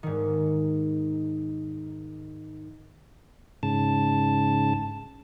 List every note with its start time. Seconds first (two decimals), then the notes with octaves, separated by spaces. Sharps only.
0.03 G#2 D#3
3.63 G#2 C#3 A5